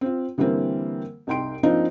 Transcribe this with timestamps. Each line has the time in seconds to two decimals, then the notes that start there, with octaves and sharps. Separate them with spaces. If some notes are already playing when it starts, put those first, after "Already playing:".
0.01 C4 F4
0.38 D3 E3 G3 A#3 C4
1.27 C2 D#4 G5 C6 D7
1.63 F3 A#3 C4 D4 D#4 F4